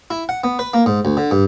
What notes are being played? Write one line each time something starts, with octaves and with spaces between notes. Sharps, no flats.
E4
F#5
B3
B4
A#3
G#2
D2
D3
G2